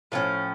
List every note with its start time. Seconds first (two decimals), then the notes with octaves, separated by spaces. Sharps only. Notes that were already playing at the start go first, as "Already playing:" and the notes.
0.12 A2 F3 C#4